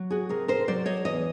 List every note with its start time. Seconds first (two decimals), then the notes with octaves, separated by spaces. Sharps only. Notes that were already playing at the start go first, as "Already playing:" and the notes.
Already playing: F#3
0.10 F#4 G#4
0.29 C3 G#4 A#4
0.48 A#4 C5
0.68 F#3 C5 D5
0.86 C#5 D#5
1.05 E2 C#5 D#5